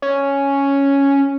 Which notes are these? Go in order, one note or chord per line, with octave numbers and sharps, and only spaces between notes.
C#4